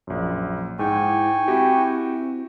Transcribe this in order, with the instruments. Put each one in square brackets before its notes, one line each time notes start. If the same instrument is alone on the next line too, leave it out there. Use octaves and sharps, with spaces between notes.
[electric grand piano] A#1 F#2
[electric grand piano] G#2 [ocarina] E4 [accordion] G5 G#5 C#6
[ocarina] C4 [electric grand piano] E4 F#4 G4